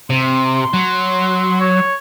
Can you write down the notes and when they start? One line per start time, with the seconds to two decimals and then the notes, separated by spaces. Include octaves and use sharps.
0.10 C3 C6
0.73 F#3
1.60 C#5